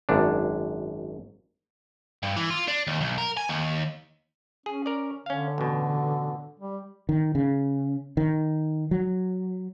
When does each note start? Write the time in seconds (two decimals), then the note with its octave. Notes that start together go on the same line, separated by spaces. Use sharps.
0.09 G#1 F#2 D4
2.23 G2
2.36 E3
2.50 F4
2.68 D4
2.87 D#2
3.01 B1
3.18 A#4
3.37 G#5
3.49 D#2
4.66 C#4 G#4
4.86 A#4 D5
5.26 D3 C#4 F5
5.58 A1 B2
6.59 G3
7.09 D#3
7.35 C#3
8.17 D#3
8.91 F#3